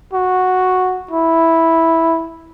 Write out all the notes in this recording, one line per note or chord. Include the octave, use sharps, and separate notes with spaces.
F#4
E4